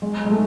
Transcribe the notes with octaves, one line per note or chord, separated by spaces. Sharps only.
G#3
G#3
A3